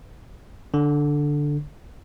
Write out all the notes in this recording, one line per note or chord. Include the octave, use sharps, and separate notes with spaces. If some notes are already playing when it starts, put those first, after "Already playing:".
D3